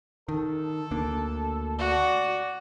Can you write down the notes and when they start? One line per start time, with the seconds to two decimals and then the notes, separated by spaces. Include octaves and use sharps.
0.29 D#3 A4
0.91 D2 A#3 D4
1.79 F#4 D5